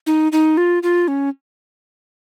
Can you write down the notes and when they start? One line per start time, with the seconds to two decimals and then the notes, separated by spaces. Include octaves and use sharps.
0.07 D#4
0.32 D#4
0.57 F4
0.83 F4
1.08 C#4